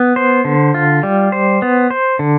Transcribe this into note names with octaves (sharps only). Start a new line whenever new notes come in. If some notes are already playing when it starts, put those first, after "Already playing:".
Already playing: B3
C5
D3
F4
G3
C5
B3
C5
D3